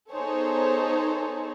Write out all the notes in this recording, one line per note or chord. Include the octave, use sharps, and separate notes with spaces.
B3 D#4 G#4 A4 C5 C#5